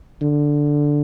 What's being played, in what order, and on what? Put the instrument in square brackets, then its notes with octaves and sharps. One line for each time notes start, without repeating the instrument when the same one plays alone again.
[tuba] D3